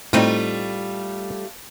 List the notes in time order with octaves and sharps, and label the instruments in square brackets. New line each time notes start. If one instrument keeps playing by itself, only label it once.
[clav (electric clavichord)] A2 C4 D#4 [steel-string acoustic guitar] G3 A3 F4